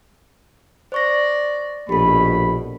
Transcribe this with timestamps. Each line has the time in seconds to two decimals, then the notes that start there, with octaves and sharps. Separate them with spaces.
0.92 C5 D5 C#6 A#6
1.89 A#1 B2 G4 A4 B5